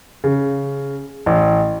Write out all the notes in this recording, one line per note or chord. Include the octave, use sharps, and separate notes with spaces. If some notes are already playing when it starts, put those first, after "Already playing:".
C#3
A1